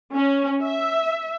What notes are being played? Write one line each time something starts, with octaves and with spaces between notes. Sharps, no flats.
C#4
E5